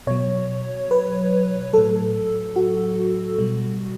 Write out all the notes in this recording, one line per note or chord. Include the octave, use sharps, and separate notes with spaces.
B2 F#3 C#5
B4
A2 F#3 A4
F#4
B2 G3